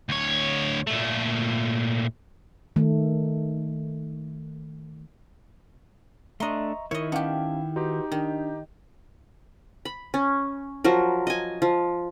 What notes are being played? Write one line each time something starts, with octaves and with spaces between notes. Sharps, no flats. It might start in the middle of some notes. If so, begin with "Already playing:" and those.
D2 C#5
A#2 A3
D#3 A3
A3 D4 D#5 E5 A#5 C6 C#6
D#3 E4 A#4 C#5 D#5
B3 C#4 G4 F5 A5
D#4 F#4 G4 B4 C6
D#3 D4
B5
C#4
F3 F#3 A#4
D#5 G#5
F3